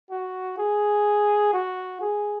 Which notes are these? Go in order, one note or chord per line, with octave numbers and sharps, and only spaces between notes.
F#4
G#4
F#4
G#4